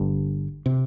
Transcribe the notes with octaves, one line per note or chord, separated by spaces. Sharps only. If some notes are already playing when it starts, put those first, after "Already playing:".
Already playing: G1 G2 D3
C3